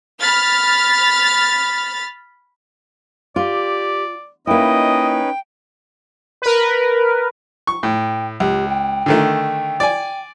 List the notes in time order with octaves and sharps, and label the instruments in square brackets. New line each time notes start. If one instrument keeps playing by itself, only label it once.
[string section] B5 F6 A6
[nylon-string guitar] F4 [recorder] G4 [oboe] D5
[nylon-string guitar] A#3 E4 [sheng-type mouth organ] C#4 D#4 B4 [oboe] D#5 [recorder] G5
[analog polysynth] A#4 B4
[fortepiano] C#6
[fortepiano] A2 [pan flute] G5
[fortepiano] C#2 [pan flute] G4
[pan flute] G5
[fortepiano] D3 D#3 A3
D5 G#5